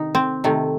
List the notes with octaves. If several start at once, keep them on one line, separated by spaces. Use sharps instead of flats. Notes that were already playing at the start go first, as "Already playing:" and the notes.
Already playing: C3 D#3 D#4
C4
C3 D#3 A3